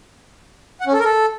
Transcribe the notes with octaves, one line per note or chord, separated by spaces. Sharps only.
F#5
C#4
A4
A#4
A4